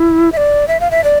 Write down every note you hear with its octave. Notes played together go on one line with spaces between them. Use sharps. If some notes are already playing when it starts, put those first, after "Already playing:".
Already playing: E4
E5
D5
E5
F5
E5
D5